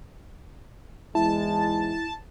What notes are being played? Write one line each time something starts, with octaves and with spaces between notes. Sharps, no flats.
E2 G#2 G#3 E4 A5